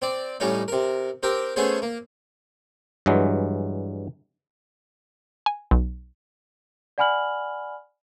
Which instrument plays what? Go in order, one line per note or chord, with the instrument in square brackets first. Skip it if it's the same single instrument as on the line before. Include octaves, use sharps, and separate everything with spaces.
[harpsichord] C4 D5
A2 G3 C#4 D#4
C3 A#4
C4 G4 A#4
A3 B3 C#4 G#4 C5
A#3
[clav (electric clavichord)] G2 E3 F#3 G#3
[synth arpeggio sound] G#5
B1
[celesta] D5 F#5 G#5 B5 F6 F#7